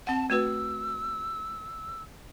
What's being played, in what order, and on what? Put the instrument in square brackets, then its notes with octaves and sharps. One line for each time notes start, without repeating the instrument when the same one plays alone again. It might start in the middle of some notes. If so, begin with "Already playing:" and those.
[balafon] C4 F#5 [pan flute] A5
[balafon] A3 F#4 B4 [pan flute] E6